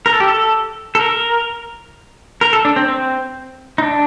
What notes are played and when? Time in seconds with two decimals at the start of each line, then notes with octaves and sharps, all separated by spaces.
0.06 A#4
0.13 A4
0.20 G4
0.27 A4
0.95 A4
1.00 A#4
2.41 A#4
2.53 A4
2.65 D4
2.76 C4
2.88 C4
3.78 D#4
3.82 D4